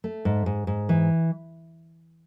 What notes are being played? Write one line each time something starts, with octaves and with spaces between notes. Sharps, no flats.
A3
G#2
G#2
G#2
E3